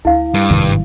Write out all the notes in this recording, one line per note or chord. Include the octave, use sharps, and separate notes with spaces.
D2 E4 F5
G2
G#1 F2 C3 D#3 G3